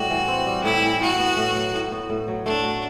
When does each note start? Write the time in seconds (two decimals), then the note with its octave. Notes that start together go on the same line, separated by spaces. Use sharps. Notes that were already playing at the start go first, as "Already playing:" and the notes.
Already playing: A2 G3 C4 F#4
0.10 E3
0.28 C4
0.46 G3
0.64 A2 E4
0.83 E3
1.01 A2 F#4
1.19 B3
1.37 A2
1.55 F#3
1.74 A2
1.91 B3
2.09 A2
2.28 F#3
2.45 A3 D4
2.63 F#4